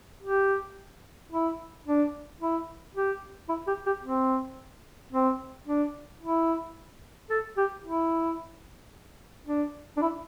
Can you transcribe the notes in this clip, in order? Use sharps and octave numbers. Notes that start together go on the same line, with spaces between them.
G4
E4
D4
E4
G4
E4
G4
G4
C4
C4
D4
E4
A4
G4
E4
D4
D4
E4